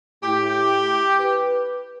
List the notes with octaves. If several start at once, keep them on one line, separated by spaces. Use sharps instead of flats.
A2 A3 E4 G4
B4